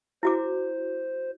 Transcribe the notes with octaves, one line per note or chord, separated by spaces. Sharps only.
E4 F#4 C5 D6